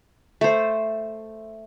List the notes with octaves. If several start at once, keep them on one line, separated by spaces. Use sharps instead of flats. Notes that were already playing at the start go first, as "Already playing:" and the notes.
A3 C5